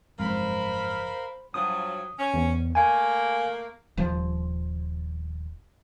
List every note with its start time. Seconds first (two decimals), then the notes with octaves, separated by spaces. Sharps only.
0.19 F#1 F2 G#2 A#4 C5 F5 B5
1.54 G2 F3 F#3 D#6
2.19 C#4
2.34 E2
2.75 A3 A#3 G#5
3.97 D#1 F3